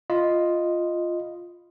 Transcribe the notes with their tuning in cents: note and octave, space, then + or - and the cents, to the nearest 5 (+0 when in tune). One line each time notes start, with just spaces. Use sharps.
F4 +0 D#5 +0 B5 +0